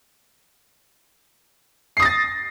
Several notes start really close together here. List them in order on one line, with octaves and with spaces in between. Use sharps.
C7 D#6 A#6 A6